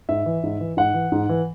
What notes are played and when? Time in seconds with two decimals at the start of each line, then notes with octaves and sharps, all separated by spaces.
0.09 G#2 E5
0.26 E3
0.44 G#2
0.60 E3
0.77 G#2 F#5
0.94 E3
1.12 G#2
1.29 E3